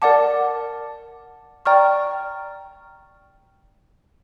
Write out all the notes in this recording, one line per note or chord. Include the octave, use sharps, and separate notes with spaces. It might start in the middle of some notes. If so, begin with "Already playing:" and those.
A#4 D5 F#5 A5 D6
D5 G5 A#5 C#6 F6